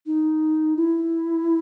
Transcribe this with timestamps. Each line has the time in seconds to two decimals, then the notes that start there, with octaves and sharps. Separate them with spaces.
0.06 D#4
0.76 E4